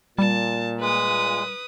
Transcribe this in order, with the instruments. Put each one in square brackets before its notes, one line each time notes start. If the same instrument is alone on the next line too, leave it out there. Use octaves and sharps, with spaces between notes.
[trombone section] A#2 [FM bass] G3 [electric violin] A5
[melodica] G#3 [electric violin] B4 D#6